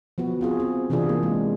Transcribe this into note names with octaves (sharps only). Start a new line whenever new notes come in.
F3 B3 F#4
C4 F4 G#4
C4
C3 E3 C4 D4 F4 G#4
A#3
G#3